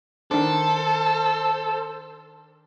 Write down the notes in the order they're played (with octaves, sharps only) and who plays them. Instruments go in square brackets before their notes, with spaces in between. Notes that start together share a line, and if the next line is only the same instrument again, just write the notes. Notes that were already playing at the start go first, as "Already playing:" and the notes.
[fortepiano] D#3 D4 [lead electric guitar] A4 [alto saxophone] C5